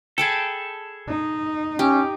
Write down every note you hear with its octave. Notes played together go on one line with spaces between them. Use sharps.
G#4 A4 G5 A5 B5
D#4
C#4 G4